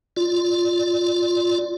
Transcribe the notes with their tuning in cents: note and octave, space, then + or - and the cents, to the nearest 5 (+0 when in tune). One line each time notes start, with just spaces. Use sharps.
F4 +0 D5 +0